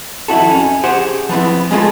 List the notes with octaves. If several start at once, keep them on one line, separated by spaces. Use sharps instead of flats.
F2 D#3 E4 F#4 A4
C#4
G4 G#4 C5 F#5
F3 B3 C4 E4
G#3 A3 F4 G#4 A4